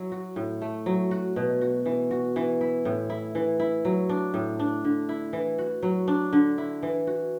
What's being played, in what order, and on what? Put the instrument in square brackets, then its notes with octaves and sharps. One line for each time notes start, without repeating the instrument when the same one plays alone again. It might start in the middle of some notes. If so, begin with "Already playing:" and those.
Already playing: [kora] F#3 E4
F#4
A2
A3
F#3
F#4
B2
F#4
E3
F#4
E3
E4
A2
E4
E3
E4
F#3
D4
A2
D4
D3
E4
E3
F#4
F#3
D4
D3
E4
E3
F#4